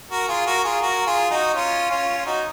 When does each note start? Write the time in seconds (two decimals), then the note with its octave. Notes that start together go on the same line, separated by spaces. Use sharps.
0.10 F#4 A#4
0.28 F4 G#4
0.46 F#4 A#4
0.64 F4 G#4
0.82 F#4 A#4
1.06 F4 G#4
1.30 D#4 F#4
1.54 C#4 F4
1.90 C#4 F4
2.18 F4
2.26 D#4 F#4